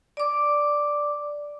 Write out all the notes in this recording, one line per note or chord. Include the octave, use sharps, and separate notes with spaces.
D5 D6